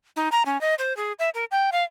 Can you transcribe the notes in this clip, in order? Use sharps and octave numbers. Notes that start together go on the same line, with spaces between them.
D#4
A#5
C#4
D#5
C5
G#4
E5
A#4
G5
F5